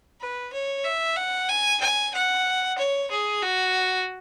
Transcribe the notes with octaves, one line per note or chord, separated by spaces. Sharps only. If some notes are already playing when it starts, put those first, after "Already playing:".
B4
C#5
E5
F#5
G#5
G#5
F#5
C#5
G#4
F#4